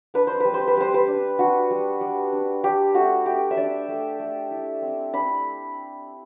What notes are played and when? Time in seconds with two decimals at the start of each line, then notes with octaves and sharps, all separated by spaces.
0.14 D4 B4
0.27 C5
0.40 G3 B4
0.54 C5
0.67 B4
0.77 G3 C5
0.94 B4
1.07 D4
1.39 D4 F#4
1.70 G3
2.01 G3
2.32 D4
2.64 D4 G4
2.95 A3 F#4
3.26 A3 G4
3.51 E5
3.57 D4 D5
3.88 A3
4.19 A3
4.51 E4
4.82 C4
5.13 D4 B5